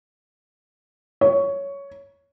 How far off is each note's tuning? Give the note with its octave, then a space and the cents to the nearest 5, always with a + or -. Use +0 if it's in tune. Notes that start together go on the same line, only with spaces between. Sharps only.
C#5 +10